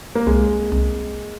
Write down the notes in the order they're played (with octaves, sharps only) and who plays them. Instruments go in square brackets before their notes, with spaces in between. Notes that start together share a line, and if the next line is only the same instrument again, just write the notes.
[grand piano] A#3
[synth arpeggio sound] C2 [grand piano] G#3
[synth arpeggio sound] C2